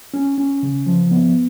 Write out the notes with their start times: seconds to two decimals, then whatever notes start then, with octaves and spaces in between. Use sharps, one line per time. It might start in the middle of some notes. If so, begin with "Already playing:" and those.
0.14 C#4
0.38 C#4
0.63 C#3
0.86 F3
1.11 B3